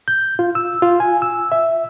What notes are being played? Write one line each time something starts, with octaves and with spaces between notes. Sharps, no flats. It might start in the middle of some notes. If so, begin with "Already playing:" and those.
G6
F4
E6
F4
G#5
E6
E5